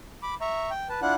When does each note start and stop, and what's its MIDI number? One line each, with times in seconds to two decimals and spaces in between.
0.23 0.34 83
0.23 0.34 86
0.41 0.70 76
0.41 0.70 82
0.41 0.70 85
0.71 0.88 79
0.89 1.00 71
0.89 1.00 81
1.02 1.15 62
1.02 1.15 64
1.02 1.15 65
1.02 1.15 78
1.02 1.15 90